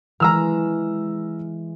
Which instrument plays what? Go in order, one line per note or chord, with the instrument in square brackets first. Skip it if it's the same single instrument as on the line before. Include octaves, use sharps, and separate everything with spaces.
[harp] E3 G#3 [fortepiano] A#5 E6 F6